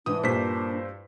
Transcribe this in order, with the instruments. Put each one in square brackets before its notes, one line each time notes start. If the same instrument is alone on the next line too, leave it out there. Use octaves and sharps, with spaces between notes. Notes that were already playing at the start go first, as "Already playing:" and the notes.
[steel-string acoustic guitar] G#2 E3 [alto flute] D4 [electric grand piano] D#6
[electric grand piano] G2 C5 B6 [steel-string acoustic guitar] A#2